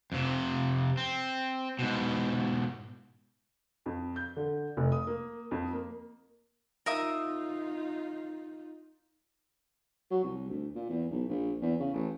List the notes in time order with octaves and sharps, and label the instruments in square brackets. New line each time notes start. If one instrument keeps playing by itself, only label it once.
[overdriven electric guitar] F2 C3
C4
G#2 B2
[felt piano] F2
G6
D3
F1
D#6
A#3
F2
A#3
[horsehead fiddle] D#4 F4 [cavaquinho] A#4 E5 D#6
[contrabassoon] F#3
C2
D2
A#2
E2
B1
A#1
E2
C#3
A1